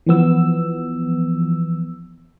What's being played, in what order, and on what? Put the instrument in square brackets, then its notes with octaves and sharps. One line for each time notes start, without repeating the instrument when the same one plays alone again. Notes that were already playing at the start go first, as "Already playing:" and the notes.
[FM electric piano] E3 F3 B3 E6